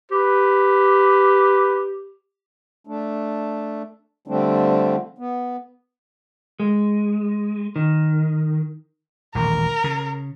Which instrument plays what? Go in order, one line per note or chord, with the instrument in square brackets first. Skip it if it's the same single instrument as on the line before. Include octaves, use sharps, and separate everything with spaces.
[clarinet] G4 [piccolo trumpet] B4
[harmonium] A3 D4
D3 F3 G3 A3 C4 D4
B3
[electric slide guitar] G#3
D#3
[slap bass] D#1 A1 D#3 [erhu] A#4
[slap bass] C#3